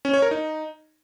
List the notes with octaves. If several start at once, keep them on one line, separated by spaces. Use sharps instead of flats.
C#4
C#5
A#4
D#4